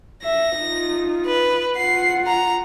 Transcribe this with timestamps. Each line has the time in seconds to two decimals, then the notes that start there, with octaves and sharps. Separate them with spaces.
0.24 E5 A#6
0.58 D#4 F4
1.26 B4
1.77 F4 F#5 C7
2.27 A#5